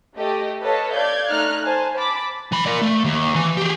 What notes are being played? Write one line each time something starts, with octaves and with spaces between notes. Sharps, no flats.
A3 G4 D#5
A4 B4 C#5 D#5 F5 A5
D5 F5 G6 G#6
A3 D#4 F6 F#6
C5 G#5 A5
A5 B5 D6 A6
E3 B5
A#4 D5
A3
D#2
E3
G4 G#4